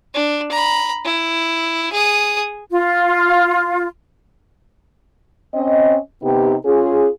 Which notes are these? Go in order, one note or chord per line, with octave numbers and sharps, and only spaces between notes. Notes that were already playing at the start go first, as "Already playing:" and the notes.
D4
A#5 B5
E4
G#4 D#6
F4
C4 C#4 D#5
C3 B3 D#4 G4
C#4 F4 G#4